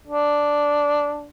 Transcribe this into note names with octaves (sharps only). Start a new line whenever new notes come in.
D4